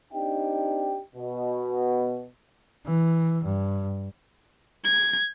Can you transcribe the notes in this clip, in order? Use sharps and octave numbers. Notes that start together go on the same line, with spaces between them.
C4 D4 D#4 G4 D#5 G5
B2
E3
G2
G#6